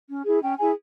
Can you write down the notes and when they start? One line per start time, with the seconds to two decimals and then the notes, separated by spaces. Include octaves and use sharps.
0.09 C#4
0.25 E4 G#4
0.42 C#4 G5
0.59 E4 G#4 G#5